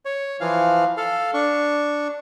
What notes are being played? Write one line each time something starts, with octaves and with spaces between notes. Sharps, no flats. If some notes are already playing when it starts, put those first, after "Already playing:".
C#5
E3 F3 F5
A4 F5
D4 C#6